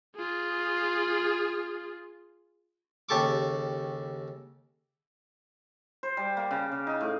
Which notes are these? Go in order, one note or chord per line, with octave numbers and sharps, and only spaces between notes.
F4 G#4
D#2 C#3 G4 A4 C#6 D6
C5
G3
A#3
C#3
C#3
D#4
A2